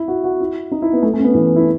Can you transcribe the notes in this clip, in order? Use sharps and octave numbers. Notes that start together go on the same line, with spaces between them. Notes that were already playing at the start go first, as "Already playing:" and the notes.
Already playing: E4
F#4
F#4
E4
D#4
E4
B3
A3
A3
C#4
B3
E3
E4